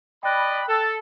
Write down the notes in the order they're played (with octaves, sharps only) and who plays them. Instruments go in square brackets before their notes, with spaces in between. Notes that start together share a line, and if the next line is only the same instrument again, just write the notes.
[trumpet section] D5 D#5 B5 [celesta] G5 F#6
[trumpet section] A4